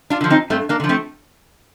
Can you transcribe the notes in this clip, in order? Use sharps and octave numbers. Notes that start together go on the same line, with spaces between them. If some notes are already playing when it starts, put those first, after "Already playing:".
D4 F4
D3 F3
C4 D#4
G2 A3 C4
A#3 D4
D3 F3
A3 C4